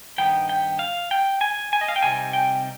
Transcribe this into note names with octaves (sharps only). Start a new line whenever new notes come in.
G2 D#3 B3 D#4 G5
G5
F5
G5
G#5
G#5
D#5
F5
G5
C3 G3 C4 D#4 G#5
G5